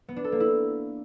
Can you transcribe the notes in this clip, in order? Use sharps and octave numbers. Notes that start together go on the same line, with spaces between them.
B3
D4
A4
A#3
E4